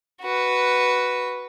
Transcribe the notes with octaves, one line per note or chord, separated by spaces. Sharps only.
F#4 B4